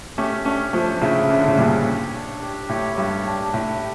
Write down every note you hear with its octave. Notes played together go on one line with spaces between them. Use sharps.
A3 C#4 G4
A3 C#4 D4
F3 A3 D4
A2 C#3 E5
C#3 D4
D3
A2 C#3
G2 A#2 G4
C#5
D4
G4
A2 C#5
G2 G4
D4
A2 G4